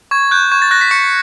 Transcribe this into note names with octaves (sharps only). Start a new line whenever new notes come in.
C#6 G#6
F#6 G6
C#6 G#6
A6
F#6 A#6
B6
C#6 C#7